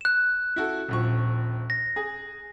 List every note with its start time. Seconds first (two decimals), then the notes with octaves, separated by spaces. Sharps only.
0.01 F#6 E7
0.56 E4 F#4 A4
0.88 D#1 A#1 C#6
1.70 A#6
1.96 G#4